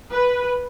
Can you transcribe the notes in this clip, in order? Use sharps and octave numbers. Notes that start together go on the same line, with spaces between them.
B4